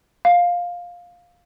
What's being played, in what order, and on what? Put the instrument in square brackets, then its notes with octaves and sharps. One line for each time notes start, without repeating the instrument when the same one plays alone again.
[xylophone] F5